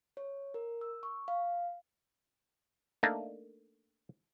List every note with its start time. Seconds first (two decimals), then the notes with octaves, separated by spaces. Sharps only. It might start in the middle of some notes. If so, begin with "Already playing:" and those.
0.17 C#5
0.54 A#4
0.81 E6
1.03 C#6
1.28 F5
3.03 A3 A#3 D4 D#4